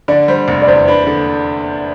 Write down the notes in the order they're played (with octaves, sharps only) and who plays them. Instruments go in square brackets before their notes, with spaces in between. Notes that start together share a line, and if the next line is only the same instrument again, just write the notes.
[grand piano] D3 [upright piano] D5
[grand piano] G3 [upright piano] C5
[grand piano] F1
[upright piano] D5
[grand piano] E2 [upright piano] C5
[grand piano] D4 [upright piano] B4
[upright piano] B4
[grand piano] D3 [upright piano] A4